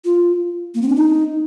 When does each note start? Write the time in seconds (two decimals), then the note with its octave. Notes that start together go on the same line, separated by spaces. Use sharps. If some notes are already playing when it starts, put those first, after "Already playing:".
0.05 F4
0.75 A#3
0.82 C4
0.89 D4
0.96 D#4